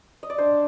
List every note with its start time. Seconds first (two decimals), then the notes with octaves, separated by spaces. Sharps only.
0.23 D#5
0.30 D5
0.37 D4 C5